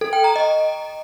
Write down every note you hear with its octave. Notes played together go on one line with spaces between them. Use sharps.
A4
G5
A#5
D#5